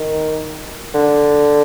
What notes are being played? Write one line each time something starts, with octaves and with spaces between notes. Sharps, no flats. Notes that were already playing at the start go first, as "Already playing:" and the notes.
Already playing: D#3
D3